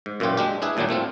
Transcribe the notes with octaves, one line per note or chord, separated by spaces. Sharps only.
G#2
F#2 A#2 E3 F4 G4
G#3 D4 G4
D4 E4 G#4 B4
D#2 A#2 F#3 G3 D4
A2 A3 C4 F4